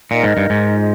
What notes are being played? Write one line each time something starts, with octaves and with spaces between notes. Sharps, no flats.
A#2 D#4 A#4 D#5
G#2
G2
G#2
F4 G#4 D#5